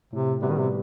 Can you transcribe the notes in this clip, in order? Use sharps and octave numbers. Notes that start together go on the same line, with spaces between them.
A2 C3
C3 G3 B3 F#4 B4
D#3
C3